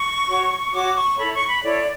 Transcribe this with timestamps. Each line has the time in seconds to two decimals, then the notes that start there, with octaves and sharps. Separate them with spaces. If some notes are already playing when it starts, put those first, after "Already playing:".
Already playing: C#6
0.28 F#4 C#5
0.73 F#4 C#5 D6
0.96 C#6
1.17 E4 A4 C#5 B5
1.33 C#6
1.48 B5
1.63 E4 A4 C#5 D5